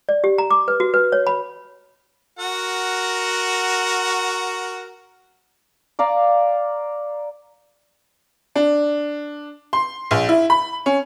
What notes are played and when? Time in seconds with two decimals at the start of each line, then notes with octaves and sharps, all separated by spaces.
0.09 D5
0.24 G4
0.38 A#5
0.51 D6
0.68 B4
0.80 F#4
0.94 B4
1.12 C#5
1.27 B5
2.39 F#4 A#4 F#5
5.99 D5 F5 A#5
8.56 D4
9.73 C6
10.11 A#1
10.29 E4
10.50 B5
10.86 C#4